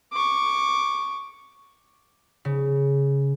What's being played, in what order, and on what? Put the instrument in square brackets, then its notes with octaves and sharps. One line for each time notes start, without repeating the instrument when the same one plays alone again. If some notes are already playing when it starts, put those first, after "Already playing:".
[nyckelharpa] C#6 D6
[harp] C#3